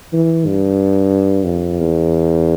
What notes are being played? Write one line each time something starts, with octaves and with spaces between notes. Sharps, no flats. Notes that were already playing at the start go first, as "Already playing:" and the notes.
E3
G2
F2
E2